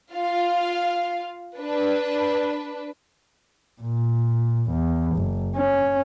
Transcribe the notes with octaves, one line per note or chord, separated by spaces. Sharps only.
F4 F5
D4 B4
A#2
E2
F#1
C#4